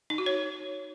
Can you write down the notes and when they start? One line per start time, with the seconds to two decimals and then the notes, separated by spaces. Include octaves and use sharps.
0.10 D#4
0.18 F#4
0.26 C#5